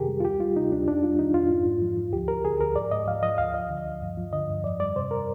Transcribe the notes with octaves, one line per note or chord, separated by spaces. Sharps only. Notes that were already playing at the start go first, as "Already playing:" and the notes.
Already playing: F2 C3 D#3 G4 G#4 A#4
G3
F4
D2 G4
G3 F4
C3 D#4
D2 D4
F2 D4
G3 F4
D#3 D#4
F2 F4
G#2
G#2
F3
F3
D2 G4
F3 A#4
D3 G#4
D2 A#4
G#2 D5
G#2 D#5
F3 F5
F3 D#5
D2 F5
F3 D#5
D3
D2
G2
F3
D3 D#5
G2
F2 D5
G3 D5
C3 C5
A#4